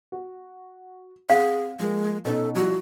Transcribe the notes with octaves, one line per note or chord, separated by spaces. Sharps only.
F#4
C4 G#4 F5 F#5
F3 G#3 A#3
B2 C#4 D#4 A4
F3 G3 E4 F#4